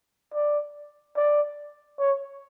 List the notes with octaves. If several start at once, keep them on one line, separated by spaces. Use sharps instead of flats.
D5
D5
C#5